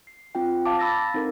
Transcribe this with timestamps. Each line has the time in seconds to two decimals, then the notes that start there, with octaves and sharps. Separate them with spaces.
0.07 C7
0.35 C4 F4 G5
0.65 F5 A5 D6
0.79 B5 E6 A6 A#6
1.14 C4 D#4 A4 A#4